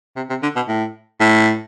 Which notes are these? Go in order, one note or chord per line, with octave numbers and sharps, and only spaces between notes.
C3
C3
D3
B2
A2
A2